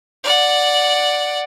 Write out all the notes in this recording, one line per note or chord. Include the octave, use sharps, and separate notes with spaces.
D5 F#5